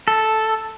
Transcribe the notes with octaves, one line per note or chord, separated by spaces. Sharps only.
A4